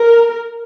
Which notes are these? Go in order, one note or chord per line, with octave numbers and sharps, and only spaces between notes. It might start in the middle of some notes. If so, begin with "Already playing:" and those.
Already playing: A#4